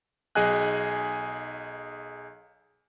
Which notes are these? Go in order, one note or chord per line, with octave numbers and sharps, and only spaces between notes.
B1 G#4 D#5 G#5 F#6